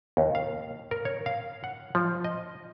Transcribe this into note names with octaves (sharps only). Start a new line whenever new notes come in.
D#2
F5
A#4
C#5
F5
F#5
F3
D#5